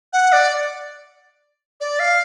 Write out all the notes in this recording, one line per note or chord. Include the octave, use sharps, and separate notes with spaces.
F#5
D5
D5
F5